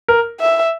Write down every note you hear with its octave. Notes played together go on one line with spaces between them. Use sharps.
A#4
E5